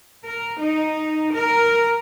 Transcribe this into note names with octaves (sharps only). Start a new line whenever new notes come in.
A#4
D#4
A#4